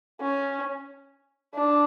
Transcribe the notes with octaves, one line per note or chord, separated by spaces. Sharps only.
C#4
D4